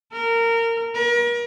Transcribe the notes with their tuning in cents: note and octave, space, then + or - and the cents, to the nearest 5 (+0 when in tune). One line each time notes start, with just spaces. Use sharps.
A#4 -20
A#4 +40